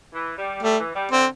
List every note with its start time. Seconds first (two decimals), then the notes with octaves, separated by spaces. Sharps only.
0.13 E3
0.37 G3
0.62 G3 A3
0.78 E3
0.94 G3
1.11 D3 C4